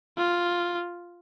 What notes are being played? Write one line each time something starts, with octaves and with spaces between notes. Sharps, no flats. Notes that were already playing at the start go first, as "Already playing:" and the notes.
F4